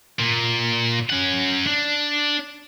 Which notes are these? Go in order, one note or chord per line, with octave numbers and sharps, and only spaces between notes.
A#2
C#4 F#5
D4